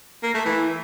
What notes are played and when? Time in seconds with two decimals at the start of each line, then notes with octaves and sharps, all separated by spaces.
0.23 A#3
0.34 A3
0.45 E3